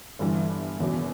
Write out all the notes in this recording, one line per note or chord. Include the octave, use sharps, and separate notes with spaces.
G1 G2 E3
F#1 E2 B2